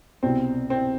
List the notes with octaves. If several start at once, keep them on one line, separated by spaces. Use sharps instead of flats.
C2 B2 C4
C4